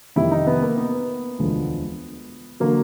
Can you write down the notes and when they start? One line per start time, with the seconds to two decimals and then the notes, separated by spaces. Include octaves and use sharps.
0.16 F2 C3 D#3 G3 E4
0.31 D#4
0.47 B3
0.62 A#3
0.77 B3
1.38 E1 D2 D3 F3 G#3
2.60 D3 F#3 A#3